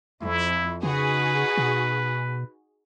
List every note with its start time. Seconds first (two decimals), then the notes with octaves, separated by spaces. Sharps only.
0.22 F2 E4
0.83 C#3 D#4 F#4 G#4 B4
1.57 B2